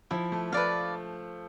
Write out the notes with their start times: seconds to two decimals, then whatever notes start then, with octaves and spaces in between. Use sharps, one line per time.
0.11 F3 E4
0.32 A3
0.52 A3 B4 D5 F5